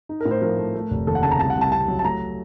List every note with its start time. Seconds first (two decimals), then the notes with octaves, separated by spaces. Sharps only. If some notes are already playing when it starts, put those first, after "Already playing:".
0.09 D#4
0.20 A#4
0.25 A2
0.31 C5
0.42 F3 A#4
0.58 A3
0.75 A3
0.91 F1
1.07 D#2 A4
1.15 F#5
1.22 C#3 A5
1.31 A#5
1.39 C2 A5
1.50 F#5
1.55 C2
1.61 A5
1.72 C3 A5
1.88 F#3
1.99 A5
2.04 A3 A#5